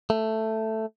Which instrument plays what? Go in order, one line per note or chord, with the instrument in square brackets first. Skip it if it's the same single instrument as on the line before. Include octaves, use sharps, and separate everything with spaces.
[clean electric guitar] A3